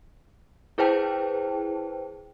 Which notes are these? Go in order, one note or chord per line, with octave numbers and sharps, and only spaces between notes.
E4 G#4 B4 C5 G5 A5